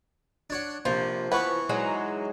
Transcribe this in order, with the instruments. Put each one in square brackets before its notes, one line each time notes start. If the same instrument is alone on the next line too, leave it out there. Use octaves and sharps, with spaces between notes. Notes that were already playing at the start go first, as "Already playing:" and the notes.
[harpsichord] D4 C#5 F#5
[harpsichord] A#1 C3 [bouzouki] F3
[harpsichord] E3 C#6 [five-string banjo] B3 B4
[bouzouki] F#3 G#3 D#4